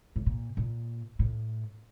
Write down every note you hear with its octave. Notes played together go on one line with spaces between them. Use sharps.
A2
A#2
A#2
A2